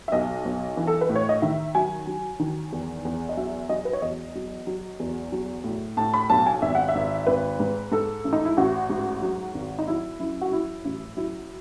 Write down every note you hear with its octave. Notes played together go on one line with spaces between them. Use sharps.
E5
B1 D#5
B1
E3
A4
B4
A2
C#5
D#5
D#3 E5
F#3 G#5
F#3
D#3
E2
E2
D#5
F#3 E5
F#3 D#5
B4
C#5
E2 D#5
F#3
F#3
E2
F#3
A2
A2 A5
B5
B1 A5
G#5
G#1 E5
F#5
E5
G#1
G#1 B4
G#2
G#2 A4
A1
D#4
E4
A1 F#4
G#2
F#3
G#1
D#4
F#3 E4
F#2 E4
F#4
F#3 E4
A1
F#3 E4